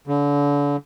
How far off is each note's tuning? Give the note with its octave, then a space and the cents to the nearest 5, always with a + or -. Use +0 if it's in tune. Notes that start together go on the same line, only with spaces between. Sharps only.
D3 -35